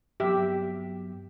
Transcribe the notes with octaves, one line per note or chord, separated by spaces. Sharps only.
G2 F#3 B3 G4 E5